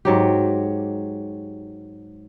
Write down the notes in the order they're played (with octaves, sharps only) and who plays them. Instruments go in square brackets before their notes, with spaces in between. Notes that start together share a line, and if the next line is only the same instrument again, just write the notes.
[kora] G#2 F#3 G4